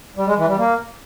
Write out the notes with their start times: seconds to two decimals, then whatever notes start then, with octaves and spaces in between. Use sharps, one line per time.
0.17 G3
0.27 G#3
0.37 E3
0.48 G3
0.58 A#3